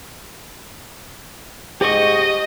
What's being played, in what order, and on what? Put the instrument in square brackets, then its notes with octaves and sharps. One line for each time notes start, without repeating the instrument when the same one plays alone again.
[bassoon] G#2 [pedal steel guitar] G4 C#6 [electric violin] D#5